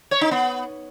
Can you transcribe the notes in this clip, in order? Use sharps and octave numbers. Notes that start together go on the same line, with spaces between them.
C#5
D#4
B3